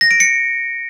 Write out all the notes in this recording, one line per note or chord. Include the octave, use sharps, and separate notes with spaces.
A#6
D7
C#7